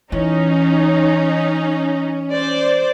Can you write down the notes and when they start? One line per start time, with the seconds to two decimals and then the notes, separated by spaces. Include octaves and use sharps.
0.12 E3 C#4 D#4
2.31 C5 D5